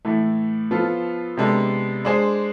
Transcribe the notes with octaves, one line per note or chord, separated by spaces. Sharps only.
A2 E3 A3
F3 B3 F4 A4
C3 G#3 B3 D4 A4
G#3 D4 G#4 C5